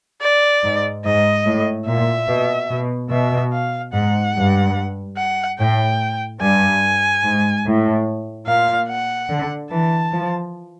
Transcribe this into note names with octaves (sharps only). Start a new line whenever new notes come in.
D5
G#2
G#2 D#5
A2
A#2 E5
B2
B2
B2 E5
F5
G#2 F#5
G2
F#5
A2 G5
G2 G#5
G#2
A2
A#2 F5
F#5
D3
E3 A5
F3